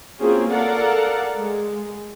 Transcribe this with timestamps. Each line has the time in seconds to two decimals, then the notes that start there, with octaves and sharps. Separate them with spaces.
0.20 A#3 C4 C#4 F4 F#4 G#4
0.52 A4 A#4 D5 F5 F#5
1.36 G#3